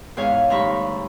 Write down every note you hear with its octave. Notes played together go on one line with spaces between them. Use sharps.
E2 G#2 C#5 F5 G#5
D2 G2 D#4 A#5 B5 C#6